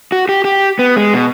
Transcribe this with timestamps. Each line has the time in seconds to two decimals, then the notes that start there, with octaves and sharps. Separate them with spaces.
0.12 F#4
0.29 G4
0.45 G4
0.79 B3
0.96 G#3
1.14 B2